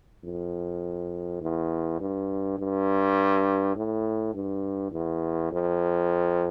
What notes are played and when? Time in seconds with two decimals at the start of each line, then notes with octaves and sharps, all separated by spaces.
0.24 F2
1.41 E2
2.00 G2
2.59 G2
3.76 A2
4.34 G2
4.92 E2
5.52 F2